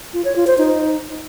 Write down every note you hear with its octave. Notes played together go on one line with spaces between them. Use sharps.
F4
C#5
F4
C5
D#4